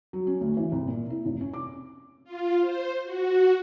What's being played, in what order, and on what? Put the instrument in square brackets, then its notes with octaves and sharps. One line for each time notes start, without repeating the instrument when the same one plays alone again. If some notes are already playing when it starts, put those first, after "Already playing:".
[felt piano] F#3
C#4
D2
E3
C2
A#2
E4
F1
C#4
D6
[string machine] F4
C5
F#4